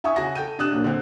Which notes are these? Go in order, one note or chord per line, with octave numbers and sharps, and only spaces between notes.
E4 E5 G#5 C#6 D#6
C#3 F#4 G#5 A#6
A4 G5 G6 D#7
C3 D4 D#6 F#6 E7
A#1 F#3 A#3 D4
D3 C4